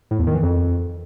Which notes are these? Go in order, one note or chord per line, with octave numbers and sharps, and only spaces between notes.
A2
E2
D#3
E3
F2